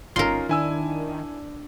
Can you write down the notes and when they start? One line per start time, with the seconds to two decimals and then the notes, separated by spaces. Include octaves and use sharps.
0.16 G1 C#4 D#4 F4 A#4 C6
0.49 D#3 D4 E4 G#5 E6